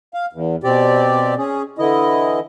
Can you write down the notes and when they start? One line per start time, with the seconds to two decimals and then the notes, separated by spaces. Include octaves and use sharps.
0.14 F5
0.33 E2
0.64 B2 C4 G4 D5
1.38 C#4 G#4
1.79 D3 E3 E4 D#5